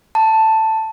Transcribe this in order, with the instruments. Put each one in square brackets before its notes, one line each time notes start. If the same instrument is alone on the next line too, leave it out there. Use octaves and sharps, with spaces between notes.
[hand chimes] A5